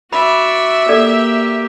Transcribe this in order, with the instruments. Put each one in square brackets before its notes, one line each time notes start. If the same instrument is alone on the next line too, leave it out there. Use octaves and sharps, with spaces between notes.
[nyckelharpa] F#4 D5 [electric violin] E5 [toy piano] B5
[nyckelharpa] A#3 G4 [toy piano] A4 D5